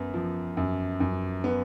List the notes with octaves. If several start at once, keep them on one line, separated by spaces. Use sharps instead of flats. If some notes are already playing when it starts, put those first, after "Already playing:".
Already playing: F#2 B3
F3
F#2
F#2
B3